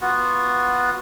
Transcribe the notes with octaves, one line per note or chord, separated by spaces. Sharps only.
B3 F4 F#4